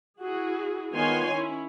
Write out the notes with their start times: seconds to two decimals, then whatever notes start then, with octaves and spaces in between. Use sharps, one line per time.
0.20 E4 F#4 G#4
0.94 D#3 B3 F4 C#5 G#5 C6
1.34 C#4 E4